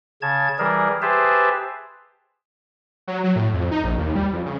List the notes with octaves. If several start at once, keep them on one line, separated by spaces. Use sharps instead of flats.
C#3 A5 G#6
E3 G3 G#4 A#4
G4 G#4 B4 C5 E5 A5
F#3
F#3
A2
F2
D#4
A#1
D#2
G3
F2
C#3